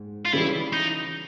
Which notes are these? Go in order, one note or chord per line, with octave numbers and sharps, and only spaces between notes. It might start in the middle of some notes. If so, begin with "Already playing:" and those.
Already playing: G#2
F4
C#3 E3 G3 E4
D#4